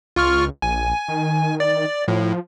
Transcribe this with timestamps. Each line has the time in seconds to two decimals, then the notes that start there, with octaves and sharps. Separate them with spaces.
0.16 C#2 F4 C#6 F6
0.62 A#1 G#5
1.08 D#3
1.60 D5
2.08 A2 F3